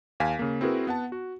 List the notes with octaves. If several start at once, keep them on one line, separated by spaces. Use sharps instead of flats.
D#2 F5 G#5 B6
C#3 A#3
C4 E4 F#4 G#4 A#4 B4
B3 F#5 A5
F#4